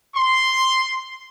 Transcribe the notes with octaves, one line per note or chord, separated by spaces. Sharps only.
C6